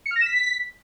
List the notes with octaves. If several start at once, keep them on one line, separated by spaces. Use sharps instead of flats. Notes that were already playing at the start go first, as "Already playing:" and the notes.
C#7
F6
A#6
E7
B6